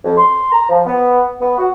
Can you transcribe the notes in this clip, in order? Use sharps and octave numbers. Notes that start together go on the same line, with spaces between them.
F2
C6
A#5
F3
B3
B3
F#4